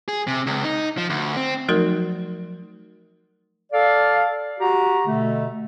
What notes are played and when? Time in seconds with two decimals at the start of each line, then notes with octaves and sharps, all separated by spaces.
0.08 G#4
0.27 C3
0.46 C#2
0.64 D#4
0.97 F3
1.09 D2
1.36 C4
1.69 F3 F#3 A3 D#4 F#4 A#4
3.72 A4 D5 F5
4.59 F#4 G4 A#5
5.06 B2 D3 A3